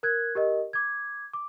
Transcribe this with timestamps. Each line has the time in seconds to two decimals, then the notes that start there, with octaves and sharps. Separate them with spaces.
0.03 A#4 F#6 G#6
0.35 G4 A#4 D#5
0.73 D6 G#6
1.33 D6